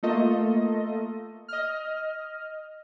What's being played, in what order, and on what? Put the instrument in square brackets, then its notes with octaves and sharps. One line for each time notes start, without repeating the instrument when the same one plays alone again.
[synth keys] A3 A#3 F4 A4 D#5
D#5 F6